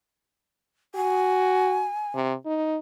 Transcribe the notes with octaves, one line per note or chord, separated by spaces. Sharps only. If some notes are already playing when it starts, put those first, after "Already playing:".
F#4 G#5
C3
D#4